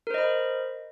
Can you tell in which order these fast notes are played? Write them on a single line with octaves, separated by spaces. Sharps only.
A#4 C5 D#5 B5